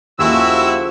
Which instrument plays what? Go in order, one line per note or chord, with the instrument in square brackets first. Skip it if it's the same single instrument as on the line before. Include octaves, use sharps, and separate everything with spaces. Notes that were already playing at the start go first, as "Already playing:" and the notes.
[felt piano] D#2 [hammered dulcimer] C#3 F3 A4 [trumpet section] E4 F#4 [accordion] E6